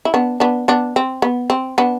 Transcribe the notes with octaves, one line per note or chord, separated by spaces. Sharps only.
E4
B3 D4
B3 D4
B3 D4
C4
B3
C4
B3 D4